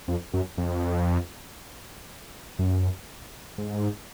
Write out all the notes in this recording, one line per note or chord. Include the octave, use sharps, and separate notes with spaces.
F2
F#2
F2
F#2
G#2